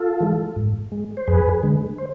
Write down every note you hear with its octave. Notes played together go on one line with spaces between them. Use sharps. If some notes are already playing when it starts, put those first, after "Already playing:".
Already playing: F4 A4
E3 G#3
G#2
G#3
C5
F2 G#4 B4
D3 G#3
C5